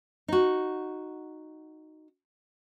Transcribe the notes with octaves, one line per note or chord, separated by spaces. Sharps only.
D#4 F#4